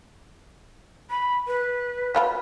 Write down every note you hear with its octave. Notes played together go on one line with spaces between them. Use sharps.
B5
B4
F#3 F4 B5